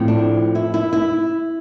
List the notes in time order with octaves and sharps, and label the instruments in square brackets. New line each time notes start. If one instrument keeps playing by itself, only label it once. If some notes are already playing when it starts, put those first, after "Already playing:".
Already playing: [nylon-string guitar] A2 F3 C4
D4
E4
E4
E4